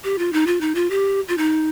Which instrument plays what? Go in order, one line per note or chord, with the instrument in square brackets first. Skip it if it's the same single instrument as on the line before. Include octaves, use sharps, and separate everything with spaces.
[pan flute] G4
F4
D#4
F4
D#4
F4
G4
F4
D#4